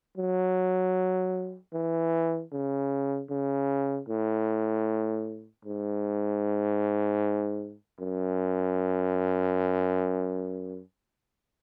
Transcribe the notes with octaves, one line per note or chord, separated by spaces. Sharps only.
F#3
E3
C#3
C#3
A2
G#2
F#2